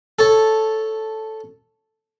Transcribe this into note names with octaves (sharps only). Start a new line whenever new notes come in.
A4 C#5 A5